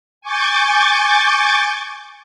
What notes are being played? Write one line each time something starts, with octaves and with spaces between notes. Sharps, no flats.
G#5 C#6 D6 G6 A6